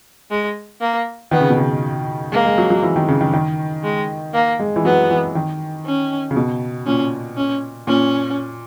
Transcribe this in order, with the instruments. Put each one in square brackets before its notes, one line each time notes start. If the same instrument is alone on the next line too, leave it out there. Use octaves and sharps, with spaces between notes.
[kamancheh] G#3
A#3
[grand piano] D#3 [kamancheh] B3
[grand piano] C#3
B2
C#3
[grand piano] G#3 [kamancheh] A#3
[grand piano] G#3
F#3
F#3
E3
D#3
C#3
D#3
D#3
[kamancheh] G#3
A#3
[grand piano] G#3
E3
[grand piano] F#3 [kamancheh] B3
[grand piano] E3
D#3
[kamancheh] C#4
[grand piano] C#3
B2
[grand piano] A#2 [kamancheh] C#4
[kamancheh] C#4
[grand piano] A#2 [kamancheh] C#4